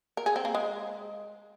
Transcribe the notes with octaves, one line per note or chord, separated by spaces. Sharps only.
A#4
G#4
C4
A#3
G#3